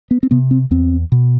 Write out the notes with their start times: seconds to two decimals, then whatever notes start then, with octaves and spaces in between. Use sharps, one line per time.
0.11 B3
0.23 C4
0.31 C3 B3
0.51 C4
0.71 E2 C4
1.12 B2